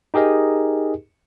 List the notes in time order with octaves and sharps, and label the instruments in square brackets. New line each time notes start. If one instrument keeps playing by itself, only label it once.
[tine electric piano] D#4 G4 G#4 A#4 D#5